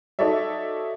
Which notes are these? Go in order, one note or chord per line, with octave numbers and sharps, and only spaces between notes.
D#4 F#4 A4 C#5 D5 E5